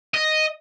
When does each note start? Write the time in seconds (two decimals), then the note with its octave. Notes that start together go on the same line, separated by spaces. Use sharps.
0.14 D#5